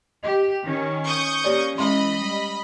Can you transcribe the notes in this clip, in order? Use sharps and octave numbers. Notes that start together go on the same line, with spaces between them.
G4 D#5
D#3 C#4
C#6 D#6 G6
A#3 C#4 G4 C#5 D5
E3 G#3 C#4 D#5 B5 C6
G3